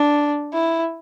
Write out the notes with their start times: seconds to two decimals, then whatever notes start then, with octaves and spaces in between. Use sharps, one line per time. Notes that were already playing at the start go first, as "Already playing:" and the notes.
Already playing: D4
0.53 E4